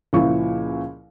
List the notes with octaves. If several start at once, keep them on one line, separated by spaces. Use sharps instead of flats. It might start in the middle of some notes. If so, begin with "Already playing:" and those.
C#2 A#2 F3 E4 C#6